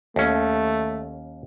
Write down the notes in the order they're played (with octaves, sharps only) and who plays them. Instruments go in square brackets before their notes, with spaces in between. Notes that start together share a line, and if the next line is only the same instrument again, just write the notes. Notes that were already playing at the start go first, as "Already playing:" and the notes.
[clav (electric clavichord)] D#2 C#4 [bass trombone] A3